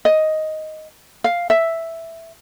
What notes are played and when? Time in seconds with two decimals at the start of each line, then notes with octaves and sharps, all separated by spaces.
0.05 D#5
1.24 F5
1.50 E5